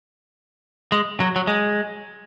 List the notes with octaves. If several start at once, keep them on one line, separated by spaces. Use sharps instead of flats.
G#3
F#3
F#3
G#3